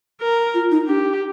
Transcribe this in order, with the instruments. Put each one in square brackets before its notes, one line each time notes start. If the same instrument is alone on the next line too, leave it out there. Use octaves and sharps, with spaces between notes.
[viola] A#4
[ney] F4
D#4
[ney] D4 [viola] G4